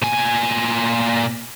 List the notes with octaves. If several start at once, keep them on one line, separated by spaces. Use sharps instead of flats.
A#2 G#5